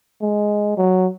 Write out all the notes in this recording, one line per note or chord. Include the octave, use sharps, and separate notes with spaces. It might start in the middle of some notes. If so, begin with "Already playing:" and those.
G#3
F#3